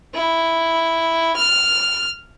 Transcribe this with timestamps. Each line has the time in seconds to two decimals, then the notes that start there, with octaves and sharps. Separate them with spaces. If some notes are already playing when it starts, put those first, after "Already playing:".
0.14 E4
1.36 F6